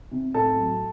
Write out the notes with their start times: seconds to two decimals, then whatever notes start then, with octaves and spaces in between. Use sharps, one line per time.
0.11 C3
0.34 A2 A4 A5
0.57 F#3